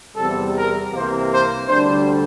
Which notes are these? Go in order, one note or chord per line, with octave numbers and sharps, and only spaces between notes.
E2 C3 G3 A4
A#4
C2 C3 E3 A#3 C5
C5
D2 D3 G3 D4 C5